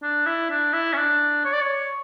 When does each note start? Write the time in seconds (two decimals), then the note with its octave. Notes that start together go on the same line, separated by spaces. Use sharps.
0.02 D4
0.26 E4
0.50 D4
0.73 E4
0.93 C#4
0.97 D4
1.45 C#5
1.53 D5
1.61 C#5